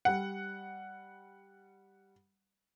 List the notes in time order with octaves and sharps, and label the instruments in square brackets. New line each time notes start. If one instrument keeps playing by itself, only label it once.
[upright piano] G3 F#5